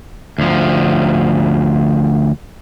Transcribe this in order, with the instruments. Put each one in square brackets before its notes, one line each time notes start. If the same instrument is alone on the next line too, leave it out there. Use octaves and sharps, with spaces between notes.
[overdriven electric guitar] D2 F3